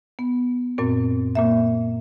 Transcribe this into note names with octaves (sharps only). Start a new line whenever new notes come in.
B3
F#2 A#2 C4
A#2 A#3 E5